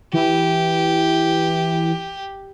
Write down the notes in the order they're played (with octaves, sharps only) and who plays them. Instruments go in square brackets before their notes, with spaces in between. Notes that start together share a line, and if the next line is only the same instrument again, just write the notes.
[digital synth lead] E3 [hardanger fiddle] G4